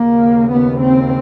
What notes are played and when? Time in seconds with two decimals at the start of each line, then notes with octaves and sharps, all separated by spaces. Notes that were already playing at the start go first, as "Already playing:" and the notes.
Already playing: D#2 C#3 A#3
0.50 B3
0.80 C4